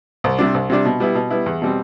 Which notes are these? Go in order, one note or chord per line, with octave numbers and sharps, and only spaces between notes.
C2
C3 G3 D4
C2
C3 G3 D4
B2
G3 B3 E4
B2
G3 B3 E4
E2
B2 G3 C4